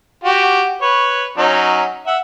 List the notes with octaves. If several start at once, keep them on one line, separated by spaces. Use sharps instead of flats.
F#4 G4
B4 C#5
F#3 C#4 D#4
E5 F#5